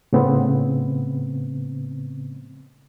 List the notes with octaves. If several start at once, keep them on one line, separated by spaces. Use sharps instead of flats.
A2 C#3 B3 C4